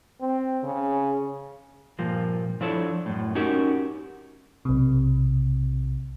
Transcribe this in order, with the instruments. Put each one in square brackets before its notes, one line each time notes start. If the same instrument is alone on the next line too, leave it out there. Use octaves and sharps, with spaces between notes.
[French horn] C4
C#3
[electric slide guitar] G2 A#2 F3 A#3
F3 D4 E4 A4 C#5
F#2 A2
C#4 D#4 F#4 G4 A#4
[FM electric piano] B1 C3